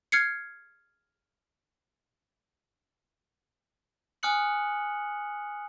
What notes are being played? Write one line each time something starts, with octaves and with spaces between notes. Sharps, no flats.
F6 G#6 C7 C#7
G#5 D#6 F6 F#6 C#7 F#7